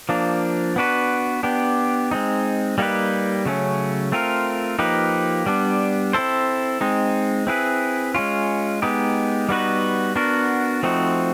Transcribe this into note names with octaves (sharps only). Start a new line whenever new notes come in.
F3 A#3 D4
B3 D4 F#4 B4
B3 D4 G4
G#3 C4 D#4
G3 A#3 D#4 G4 B4
C#3 F#3 A3 C#4
A3 C4 F4 A#4
F3 A#3 D#4 G4 B4
G3 B3 D4
C4 E4 A4 C5
G#3 C4 D#4
C4 E4 G#4 B4
G#3 C#4 F4
G#3 B3 D#4 G4
G3 B3 D#4 F#4 B4
B3 D4 F#4 A#4
F3 A3 C4 D#4 F#4